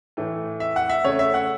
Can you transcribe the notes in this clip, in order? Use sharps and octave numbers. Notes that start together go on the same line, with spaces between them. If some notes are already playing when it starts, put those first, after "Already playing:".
A2 E3 A3
E5
F#5
E5
C#3 A3 C#5
E5
F#5